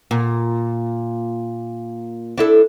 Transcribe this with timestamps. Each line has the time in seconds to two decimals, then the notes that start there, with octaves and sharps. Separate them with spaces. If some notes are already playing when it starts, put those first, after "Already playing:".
0.11 A#2
2.38 D4 E4 A4